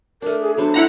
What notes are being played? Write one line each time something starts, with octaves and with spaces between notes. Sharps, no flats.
A3 D4 A#4
G#4
F#3 B3 D4 C5
E4 C5 F#5 A#5